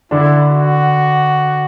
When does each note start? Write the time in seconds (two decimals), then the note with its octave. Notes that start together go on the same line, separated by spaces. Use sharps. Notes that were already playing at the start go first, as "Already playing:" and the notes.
0.11 D3 D4 E4
0.49 F#4